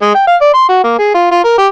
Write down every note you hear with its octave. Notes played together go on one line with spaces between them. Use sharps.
G#3
G5
F5
D5
C6
F#4
A#3
G#4
F4
F4
A#4
G4